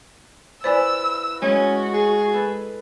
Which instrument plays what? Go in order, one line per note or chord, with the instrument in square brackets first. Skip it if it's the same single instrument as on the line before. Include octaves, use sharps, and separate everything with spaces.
[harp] E4 B4 [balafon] C5 D5 G#5 [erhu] E6
[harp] G#3 [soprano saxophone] C#4 [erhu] F#4
[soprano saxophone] G#4
[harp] A4 B4